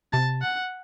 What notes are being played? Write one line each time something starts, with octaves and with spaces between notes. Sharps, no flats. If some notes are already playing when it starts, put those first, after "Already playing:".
C3 A5
F#5